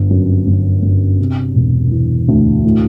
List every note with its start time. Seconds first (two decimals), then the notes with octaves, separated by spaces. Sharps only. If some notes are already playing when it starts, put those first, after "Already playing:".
Already playing: G1
0.10 F#2
0.47 G1
0.82 G1
1.19 C3
1.55 E1
1.91 E3
2.28 D2
2.65 A2